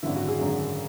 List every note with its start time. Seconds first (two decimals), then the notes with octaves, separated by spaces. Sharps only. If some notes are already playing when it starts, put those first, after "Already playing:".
0.03 G#1 F#2 D3 E4
0.16 F#4
0.28 G#4
0.41 G#1 F#2 D3